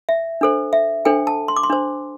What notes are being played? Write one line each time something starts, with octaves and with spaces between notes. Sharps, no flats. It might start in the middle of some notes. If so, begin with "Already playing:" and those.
E5
D4 A4 C5
E5
D4 A4 C5 G5
A5
C6
D6
C6
D4 C5